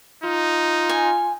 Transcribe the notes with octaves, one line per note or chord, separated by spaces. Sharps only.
D#4 F4
G#5